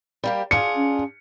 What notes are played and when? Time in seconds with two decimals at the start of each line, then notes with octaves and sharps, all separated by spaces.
0.24 G3 A#3 G4
0.51 D4 F4 G#4 C#7
0.76 C#4